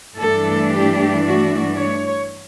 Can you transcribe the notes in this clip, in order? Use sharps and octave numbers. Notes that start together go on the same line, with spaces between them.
G2 E3 A3 D4 A4
G4
F#4
C#5